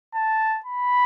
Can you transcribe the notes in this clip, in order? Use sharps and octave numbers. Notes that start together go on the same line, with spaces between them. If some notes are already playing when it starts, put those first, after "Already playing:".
A5
B5